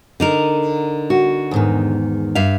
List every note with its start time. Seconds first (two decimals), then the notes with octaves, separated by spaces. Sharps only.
0.20 D3 D#4 A#4
1.10 F#4
1.51 E2 G#2 D#3
2.35 G2 E5 F5